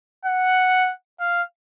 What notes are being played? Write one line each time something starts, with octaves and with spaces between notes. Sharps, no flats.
F#5
F5